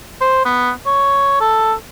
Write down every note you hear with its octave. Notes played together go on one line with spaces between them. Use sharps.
C5
B3
C#5
A4